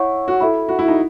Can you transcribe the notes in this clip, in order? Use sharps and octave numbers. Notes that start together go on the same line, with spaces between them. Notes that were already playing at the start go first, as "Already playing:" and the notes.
Already playing: E4 C#5 F#5 C#6
F#4
E4 A4 E5 B5
F#4
E4
D#4